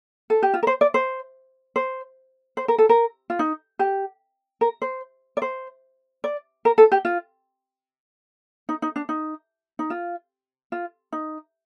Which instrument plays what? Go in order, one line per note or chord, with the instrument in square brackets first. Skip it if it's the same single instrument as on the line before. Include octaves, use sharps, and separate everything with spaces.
[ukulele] A4
G4
F4
A#4
C5
D5
C5
C5
C5
A#4
A4
A#4
F4
D#4
G4
A#4
C5
D5
C5
D5
A#4
A4
G4
F4
D#4
D#4
D4
D#4
D#4
F4
F4
D#4